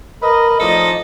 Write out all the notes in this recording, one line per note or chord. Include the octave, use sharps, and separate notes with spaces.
A#4 B4 D#5
A2 F3 D#4 A4 D5 D#5